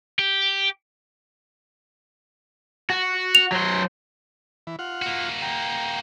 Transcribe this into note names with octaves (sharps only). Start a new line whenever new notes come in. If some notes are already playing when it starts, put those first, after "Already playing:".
G4
F#4
F7
F#3 C5
E3
F4 F#5
A#3 F#4
G5 A#5